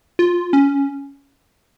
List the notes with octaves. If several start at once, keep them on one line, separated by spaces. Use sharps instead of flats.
F4
C#4